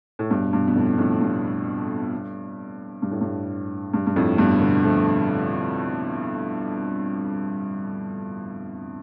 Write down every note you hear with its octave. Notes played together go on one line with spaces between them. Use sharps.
A2
G2 B2
G2 B2
B2
F2 A2
F2 A2
G2
G2
A2
G2
G2
G2
F2 A2
G2 B2
B2 D3
F3 A3